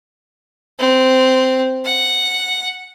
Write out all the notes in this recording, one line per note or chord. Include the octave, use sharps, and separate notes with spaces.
C4
F#5